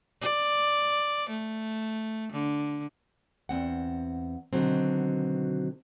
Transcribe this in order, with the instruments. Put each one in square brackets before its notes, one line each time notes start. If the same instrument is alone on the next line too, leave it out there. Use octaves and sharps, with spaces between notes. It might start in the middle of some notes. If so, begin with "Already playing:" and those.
[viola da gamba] D5
A3
D3
[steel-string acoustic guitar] E2 C4 F#5
B2 D3 D#3 F#3 C4